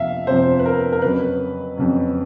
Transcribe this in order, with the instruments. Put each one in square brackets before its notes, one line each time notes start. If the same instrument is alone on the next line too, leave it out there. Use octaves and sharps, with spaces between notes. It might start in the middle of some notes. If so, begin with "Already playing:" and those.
Already playing: [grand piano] F2 C3 F3 E5 F5
F2 C3 F3 C5
B4
A#4
A#4
F2 C#3 F#3 B4
F2 C#3 F#3